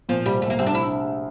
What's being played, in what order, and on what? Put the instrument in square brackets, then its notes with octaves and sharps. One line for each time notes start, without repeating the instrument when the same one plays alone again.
[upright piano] A#2 [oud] F3
[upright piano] C2 [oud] G3
[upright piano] C2 [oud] A3
[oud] A#3
[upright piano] C2 [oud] C4
[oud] D4
E4